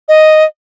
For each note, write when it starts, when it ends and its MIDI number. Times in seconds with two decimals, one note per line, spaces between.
0.09 0.44 75